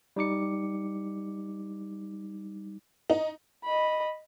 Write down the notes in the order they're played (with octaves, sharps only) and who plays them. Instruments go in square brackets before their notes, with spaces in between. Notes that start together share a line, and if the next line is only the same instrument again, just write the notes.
[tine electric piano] G3 D#4 D6 C#7
[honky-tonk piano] D#4
[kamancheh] D#5 B5